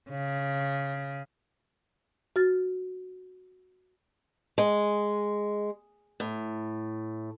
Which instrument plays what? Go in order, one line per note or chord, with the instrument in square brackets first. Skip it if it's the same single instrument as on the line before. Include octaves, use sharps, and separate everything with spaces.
[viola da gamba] C#3
[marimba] F#4 F6 A6
[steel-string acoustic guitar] G#3
A2